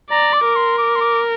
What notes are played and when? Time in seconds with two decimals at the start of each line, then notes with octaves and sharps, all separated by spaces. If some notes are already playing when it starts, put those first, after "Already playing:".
0.10 D5 A#5
0.33 D6
0.45 A#4
0.56 C6
0.78 D6
0.96 C6
1.01 D6